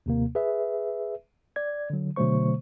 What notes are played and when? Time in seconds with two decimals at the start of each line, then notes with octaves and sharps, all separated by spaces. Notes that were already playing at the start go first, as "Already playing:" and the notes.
0.06 D#2 C3 A#3
0.35 G#4 B4 E5
1.56 D5 G#6
1.90 D3 F#3
2.16 B2 D3 F#3 A3 C5 C#6